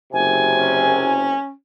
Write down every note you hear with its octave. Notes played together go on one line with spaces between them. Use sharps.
F#1 C3 G#5
C#4